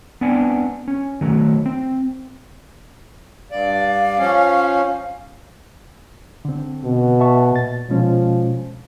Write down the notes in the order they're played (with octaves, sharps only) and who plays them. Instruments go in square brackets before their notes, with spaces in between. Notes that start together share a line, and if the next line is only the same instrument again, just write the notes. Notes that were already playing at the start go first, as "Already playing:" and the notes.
[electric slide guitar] B3 C4 D4 F#5 G#5
C#4
D#3 F#3 A3
C4
[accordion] G2 D5 [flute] F5
[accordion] F3 C#4
[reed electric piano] D3 C4
[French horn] B2
[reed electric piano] E5 A5 C#6
A#2 A6
[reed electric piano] B2 G#3 C#4 [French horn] F3